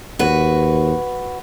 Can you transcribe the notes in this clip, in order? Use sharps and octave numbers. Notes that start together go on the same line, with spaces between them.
D#2 F#4 B4